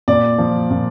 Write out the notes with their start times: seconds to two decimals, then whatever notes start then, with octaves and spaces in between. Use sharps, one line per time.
0.08 A#2 D5
0.38 F3
0.71 A#2